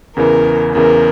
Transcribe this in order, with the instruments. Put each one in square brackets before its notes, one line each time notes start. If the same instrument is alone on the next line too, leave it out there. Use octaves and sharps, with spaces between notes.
[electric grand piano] E2 C#3 E3 [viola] A#4
[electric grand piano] E2 C#3 E3 [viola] A#4